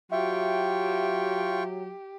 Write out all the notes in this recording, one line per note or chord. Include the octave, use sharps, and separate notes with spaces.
F#3 F4 G4 E5 G5 C#6